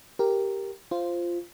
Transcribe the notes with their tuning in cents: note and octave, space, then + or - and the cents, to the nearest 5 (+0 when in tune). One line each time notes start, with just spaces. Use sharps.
G4 +0 A#4 +0
F4 -10 C5 +0